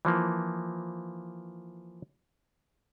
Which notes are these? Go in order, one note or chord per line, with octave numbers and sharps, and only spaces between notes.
E3 F3 A#3